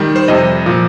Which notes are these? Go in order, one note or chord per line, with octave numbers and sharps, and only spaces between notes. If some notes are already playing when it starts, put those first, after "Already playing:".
Already playing: D#3 G3
C5
F2 C3 G3 D#5
A#2 F3